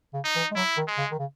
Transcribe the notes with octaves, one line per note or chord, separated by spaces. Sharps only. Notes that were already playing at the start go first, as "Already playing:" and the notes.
C#3
D#4
E3
G#3
F#3 E4
D#3
G#3
C#3
D#3
C#3